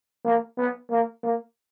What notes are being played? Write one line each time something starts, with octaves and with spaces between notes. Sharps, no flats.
A#3
B3
A#3
A#3